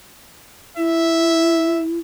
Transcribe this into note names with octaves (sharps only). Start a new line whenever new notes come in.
E4 E5